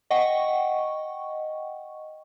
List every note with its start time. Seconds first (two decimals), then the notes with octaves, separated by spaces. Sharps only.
0.10 D#5 F#5 G5 C#6